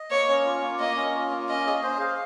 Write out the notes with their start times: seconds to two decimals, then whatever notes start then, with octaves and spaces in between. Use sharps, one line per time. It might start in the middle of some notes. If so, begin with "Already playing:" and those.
Already playing: D#5
0.11 A#3 C#5
0.28 C#4
0.45 F4
0.62 A#3
0.79 A#3 D#5
0.96 C#4
1.14 F4
1.31 A#3
1.49 C#4 D#5
1.66 G#4
1.83 C5
2.00 F5